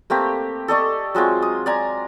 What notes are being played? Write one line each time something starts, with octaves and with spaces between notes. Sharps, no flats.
A3 A#3 C4 G4
A4 D5 D#5 C#6
F#3 G#3 C4 F4
D#6
D5 G#5 A#5